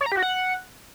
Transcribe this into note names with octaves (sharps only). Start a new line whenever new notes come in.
C#5
A#5
G4
F#4
F#5